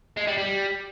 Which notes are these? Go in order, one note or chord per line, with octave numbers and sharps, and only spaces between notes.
G#3
G3
G3